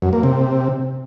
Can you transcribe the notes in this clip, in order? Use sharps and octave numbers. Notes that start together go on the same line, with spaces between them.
F#2
A#3
C3